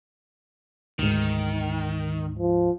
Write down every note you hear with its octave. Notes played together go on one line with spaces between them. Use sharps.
D2 G#2 D#3
F3